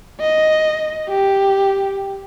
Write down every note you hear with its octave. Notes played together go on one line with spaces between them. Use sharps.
D#5
G4